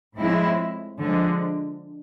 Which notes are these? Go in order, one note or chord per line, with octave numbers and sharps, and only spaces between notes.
A2 F3 G#3 C4 E4
D3 F3 G#3